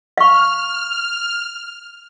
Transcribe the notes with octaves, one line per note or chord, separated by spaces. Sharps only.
F5 C#6 F6